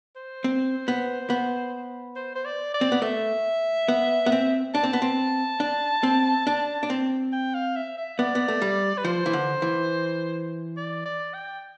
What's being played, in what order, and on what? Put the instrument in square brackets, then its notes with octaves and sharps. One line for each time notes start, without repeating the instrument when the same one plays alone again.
[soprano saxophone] C5
[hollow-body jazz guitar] C4
B3
B3
[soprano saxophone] C5
C5
D5
D5
[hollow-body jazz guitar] C4
B3
[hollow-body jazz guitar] A3 [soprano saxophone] E5
[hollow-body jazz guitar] B3
B3
C4
[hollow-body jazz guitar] D4 [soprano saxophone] A5
[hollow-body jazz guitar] C4
B3
C4
D4
C4
D4
D4
C4
[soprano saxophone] G5
F5
E5
E5
[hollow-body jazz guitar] B3 [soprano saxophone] D5
[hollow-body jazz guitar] B3
A3
G3
[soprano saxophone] B4
[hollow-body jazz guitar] F3 [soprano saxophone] C5
[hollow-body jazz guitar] E3
D3
E3
[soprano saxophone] D5
D5
G5